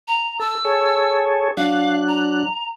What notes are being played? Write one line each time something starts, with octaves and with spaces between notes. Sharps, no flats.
A#5
A4 E6
G#4 A4 C#5
F#3 D4 F5 F#6
A#5